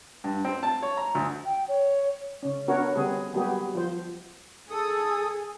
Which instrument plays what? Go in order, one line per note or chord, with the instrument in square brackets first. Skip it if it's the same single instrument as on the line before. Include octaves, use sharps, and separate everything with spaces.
[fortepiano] G2
C4
A5
C#5
A#5
D2
[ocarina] G5
C#5
[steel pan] C#3 C#4
B3 C#4 D4 F#4 A#4 C#5
D3 G3 B3 C4 G#4
F#3 G3 A#3 B3 G4 G#4
F3 C5
[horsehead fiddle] G#4 [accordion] A4 D#6